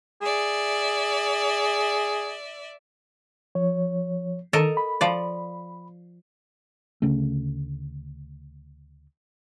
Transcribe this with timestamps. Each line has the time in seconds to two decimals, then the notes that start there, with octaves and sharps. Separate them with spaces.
0.22 G#4 D5 E5
3.55 F3 C#5
4.53 D#3 A4 A#4 D#5
4.77 B5
5.01 F3 D5
7.02 D2 C#3 A3